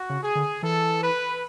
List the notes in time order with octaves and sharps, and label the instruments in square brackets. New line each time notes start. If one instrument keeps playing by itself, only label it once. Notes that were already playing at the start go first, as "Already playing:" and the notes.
Already playing: [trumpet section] F#4
[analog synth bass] C#3
[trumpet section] G#4
[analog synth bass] D3
[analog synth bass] E3 [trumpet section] A4
[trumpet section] B4